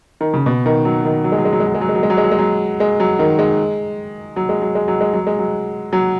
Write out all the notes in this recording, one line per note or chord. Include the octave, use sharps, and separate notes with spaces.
D#3
C#3
B2
D#3
F#3
D#3
F#3
G#3
F#3
G#3
F#3
G#3
F#3
G#3
F#3
G#3
F#3
G#3
F#3
G#3
F#3
G#3
F#3
G#3
F#3
D#3
G#3
F#3
G#3
F#3
G#3
F#3
G#3
F#3
G#3
F#3
F#3